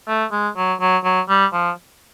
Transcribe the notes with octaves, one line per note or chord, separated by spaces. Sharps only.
A3
G#3
F#3
F#3
F#3
G3
F3